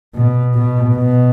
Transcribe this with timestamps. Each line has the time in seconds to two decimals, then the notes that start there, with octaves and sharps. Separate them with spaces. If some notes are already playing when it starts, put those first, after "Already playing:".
0.14 B2
0.54 B2
0.95 B2